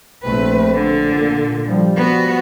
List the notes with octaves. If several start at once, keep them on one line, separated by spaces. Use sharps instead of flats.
A#1 A3 C4 B4
D3
A#2
F3 G3
B3 F#4